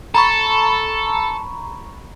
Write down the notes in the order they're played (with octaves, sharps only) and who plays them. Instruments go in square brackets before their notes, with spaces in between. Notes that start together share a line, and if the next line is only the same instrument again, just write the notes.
[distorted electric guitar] A4 [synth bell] A#5 B5 C#6